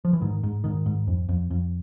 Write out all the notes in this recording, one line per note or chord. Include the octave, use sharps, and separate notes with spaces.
F3
E3
G#2 D#3
G#2
G#2 D#3
G#2
F2
F2
F2